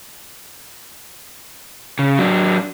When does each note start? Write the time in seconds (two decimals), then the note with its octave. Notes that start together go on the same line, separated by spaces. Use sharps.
1.99 C#3
2.19 F#3 D4